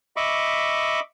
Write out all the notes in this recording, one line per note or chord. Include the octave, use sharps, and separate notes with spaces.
D#5 E5 B5 C#6 D6